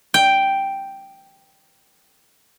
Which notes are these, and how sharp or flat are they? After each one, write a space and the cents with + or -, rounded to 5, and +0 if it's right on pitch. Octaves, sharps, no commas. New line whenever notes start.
G5 +0